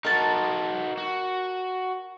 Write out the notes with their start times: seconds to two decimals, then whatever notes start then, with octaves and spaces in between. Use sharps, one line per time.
0.05 D#4 F#4 A#4 A5
0.98 F#4